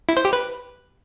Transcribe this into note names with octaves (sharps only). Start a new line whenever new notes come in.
E4
C5
G4
B4